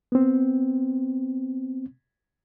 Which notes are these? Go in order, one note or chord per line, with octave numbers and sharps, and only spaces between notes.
B3 C4